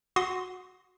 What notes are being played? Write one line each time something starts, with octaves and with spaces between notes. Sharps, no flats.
F#4 C6 D#6